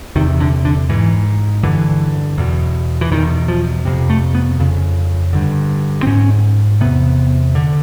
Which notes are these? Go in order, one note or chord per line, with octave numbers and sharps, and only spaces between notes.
E2 C3 D#3
D3
D3
G#2 E3
G2 D3 E3
E2 B2
E3
E2 B2 D#3
F3
F2 C3
A3
B3
F2 C#3
G2 D3
C4
G#2 C#4
E2 C3 B3
D3